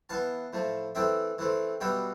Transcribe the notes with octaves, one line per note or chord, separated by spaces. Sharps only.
E3 B3 F5 A5
A2 F3 A3
E3 A3 C4 E5 G5
E3 A3 C4
B2 G3 B3 E5 G5